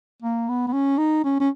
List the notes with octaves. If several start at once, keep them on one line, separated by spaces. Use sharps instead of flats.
A#3
B3
B3
C#4
D#4
C#4
C#4